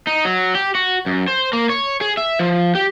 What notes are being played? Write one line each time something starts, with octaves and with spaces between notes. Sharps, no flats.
D#4
F#3
G4
F#4
F#2
C5
A#3
C#5
G#4
E5
F3
G4